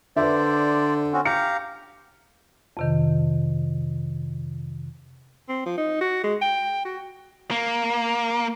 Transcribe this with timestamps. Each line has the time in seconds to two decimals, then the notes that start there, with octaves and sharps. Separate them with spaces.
0.17 D3 B4 C5 D5 E5
1.13 C4 C#4 F#4
1.25 G4 F5 A#5 C#7
2.77 F2 C3 D#3
5.49 C4
5.66 F3
5.78 D#4
6.01 F#4
6.24 G#3
6.42 G5
6.85 F#4
7.51 A#3